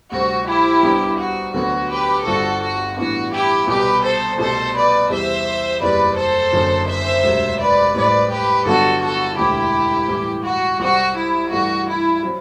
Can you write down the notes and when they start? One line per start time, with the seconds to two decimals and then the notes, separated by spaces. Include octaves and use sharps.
0.11 D2 C3 G3 C4 F#4
0.47 E4 G4
0.83 C2 C3 G3 B3 D4
1.18 F#4
1.54 D2 D3 F#3 B3 F#4
1.89 G4 B4
2.24 G1 G2 D3 G3 C4 F#4 A4
2.60 F#4
2.96 A2 E3 G3 B3 D4 F#4
3.31 E4 G4
3.67 C2 B2 G3 G4 B4
4.03 A4 C5
4.38 C2 B2 A3 A4 C5
4.74 B4 D5
5.10 E2 C3 E3 G3 C5 E5
5.81 F#1 E2 C3 G3 B4 D5
6.17 A4 C5
6.52 F#1 F#2 D3 F#3
6.88 C5 E5
7.24 E1 D2 C3 F#3
7.59 B4 D5
7.95 A1 A2 G3 C4 B4 D5
8.30 G4 B4
8.66 G1 G2 D3 F#3 B3 F#4 A4
9.01 F#4 A4
9.36 E1 D2 D3 E4 G4
10.08 A2 E3 G3
10.44 F#4
10.80 C2 C3 G3 C4 F#4
11.15 E4
11.50 G2 E3 A3 E4 F#4
11.86 E4
12.23 F#3 C4